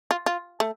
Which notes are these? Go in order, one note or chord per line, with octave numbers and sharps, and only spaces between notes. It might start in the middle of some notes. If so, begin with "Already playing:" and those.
F4
F4
A3